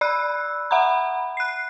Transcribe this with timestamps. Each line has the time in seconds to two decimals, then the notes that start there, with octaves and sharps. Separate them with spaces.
0.01 D5 B5 E6 F#6
0.71 E5 F#5 A#5 B5
1.37 F#6 C7